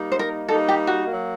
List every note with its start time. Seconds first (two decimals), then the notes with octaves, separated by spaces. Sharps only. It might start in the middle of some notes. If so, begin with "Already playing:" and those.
Already playing: G3 A#3 D#4
0.12 C5
0.19 A#4
0.48 G3 A#3 D#4 A4
0.68 G4
0.87 F#4
1.07 F#3 A#3